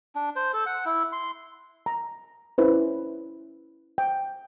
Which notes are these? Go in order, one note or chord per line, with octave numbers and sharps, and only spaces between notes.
D4
C5
A4
F#5
E4
C6
A#5
C#4 E4 B4 C5
G5